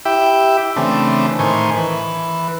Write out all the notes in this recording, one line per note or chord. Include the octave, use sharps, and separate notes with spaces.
E4 G4 E5 G5
C#3 E3 A3 C4 D4
A2 D#3 C5 G#5 C#6
E3 B4